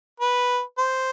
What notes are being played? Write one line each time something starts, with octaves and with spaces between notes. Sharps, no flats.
B4
C5